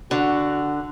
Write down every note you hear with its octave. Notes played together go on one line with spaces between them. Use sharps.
D3 F#4 F#5